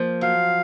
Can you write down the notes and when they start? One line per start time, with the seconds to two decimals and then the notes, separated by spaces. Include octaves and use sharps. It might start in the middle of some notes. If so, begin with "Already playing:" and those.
Already playing: F3 A#3
0.21 F#3 F5